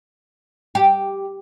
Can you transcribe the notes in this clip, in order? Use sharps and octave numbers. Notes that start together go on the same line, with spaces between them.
G4